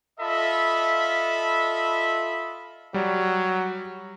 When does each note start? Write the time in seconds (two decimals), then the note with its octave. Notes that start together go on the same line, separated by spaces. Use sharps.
0.20 F4 A4 D#5 E5 B5
2.94 F#3 G3